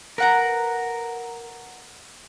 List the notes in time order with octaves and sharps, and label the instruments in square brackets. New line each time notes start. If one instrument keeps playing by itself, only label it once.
[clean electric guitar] A#4 [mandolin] B4 F#5 A#5